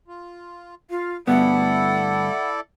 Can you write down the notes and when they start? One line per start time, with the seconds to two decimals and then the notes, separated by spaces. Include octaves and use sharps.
0.08 F4
0.90 F4 F5
1.27 D2 G2 B3 E4 A4 D5 F#5